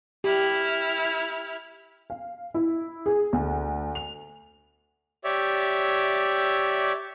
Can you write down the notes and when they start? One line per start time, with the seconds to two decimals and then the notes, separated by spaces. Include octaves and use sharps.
0.24 E4 G4 F6
2.10 F5
2.54 E4
3.06 G#4
3.33 D2
3.95 F7
5.24 G4 C#5 D5 E5